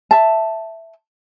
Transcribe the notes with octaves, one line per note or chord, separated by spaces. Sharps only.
E5 A5